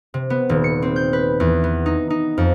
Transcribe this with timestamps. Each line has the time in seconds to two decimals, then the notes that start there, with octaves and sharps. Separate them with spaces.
0.14 C3
0.30 B3
0.49 D#1
0.64 C#7
0.82 C4
0.96 G6
1.13 B4
1.40 E2
1.64 B3
1.86 D#4
2.10 D#4
2.38 F2